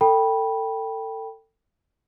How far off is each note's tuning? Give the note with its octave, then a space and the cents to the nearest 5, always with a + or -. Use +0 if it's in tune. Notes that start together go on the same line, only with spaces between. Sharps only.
A4 +30 G5 +0 B5 -15